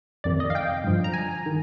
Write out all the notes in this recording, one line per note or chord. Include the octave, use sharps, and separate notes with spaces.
F2 C3 D#3 D5
D#5
F5
G5
G2 D3 F3
A#5
G#5
D#3